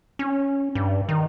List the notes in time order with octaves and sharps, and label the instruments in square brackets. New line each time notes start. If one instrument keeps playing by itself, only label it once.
[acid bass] C#4
G2
D#3